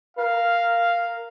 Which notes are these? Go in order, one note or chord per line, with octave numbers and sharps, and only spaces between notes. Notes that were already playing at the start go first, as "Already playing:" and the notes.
A#4 F5